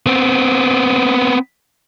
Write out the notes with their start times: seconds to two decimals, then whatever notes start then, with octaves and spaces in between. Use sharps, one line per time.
0.06 B3 C4